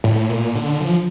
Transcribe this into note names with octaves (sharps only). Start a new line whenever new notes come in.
A2
A#2
D3
F3